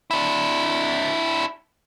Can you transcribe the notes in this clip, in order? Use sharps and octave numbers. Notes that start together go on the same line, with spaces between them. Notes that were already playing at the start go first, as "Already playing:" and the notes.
D4 E4